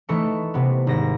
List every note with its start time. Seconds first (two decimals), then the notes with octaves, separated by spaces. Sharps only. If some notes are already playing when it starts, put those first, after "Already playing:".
0.09 E3 A3 D#4 A4 C#6 C#7
0.54 C3 B3
0.87 G#1 A#6